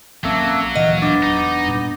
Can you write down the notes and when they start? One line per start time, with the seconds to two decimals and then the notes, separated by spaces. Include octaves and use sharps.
0.24 A#1 F#3 A#3 C4 C#4 A4 E5
0.75 D2 A#2 E3 D#5 F5 F#5
1.02 B3 D4 D6
1.23 E1 D#4
1.65 G2 A#2